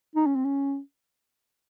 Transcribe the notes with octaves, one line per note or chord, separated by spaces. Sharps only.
D#4
C#4
C4
C#4